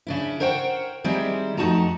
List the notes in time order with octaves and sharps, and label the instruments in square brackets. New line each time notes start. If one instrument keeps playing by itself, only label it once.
[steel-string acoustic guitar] C#3 D4 E4
A#4 C5 C#5 F#5 G5
D#3 G3 G#3 C4 E4
F2 A3 D#4 F#4 A5 A#5